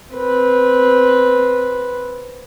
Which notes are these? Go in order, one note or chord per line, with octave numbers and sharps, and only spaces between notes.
C4 B4